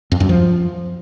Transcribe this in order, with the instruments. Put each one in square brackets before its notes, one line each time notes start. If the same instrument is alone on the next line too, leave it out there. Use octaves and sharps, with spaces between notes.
[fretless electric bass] F2
F#2
F3